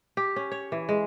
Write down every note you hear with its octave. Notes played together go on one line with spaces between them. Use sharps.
G4
C#4
C#5
E3
G#3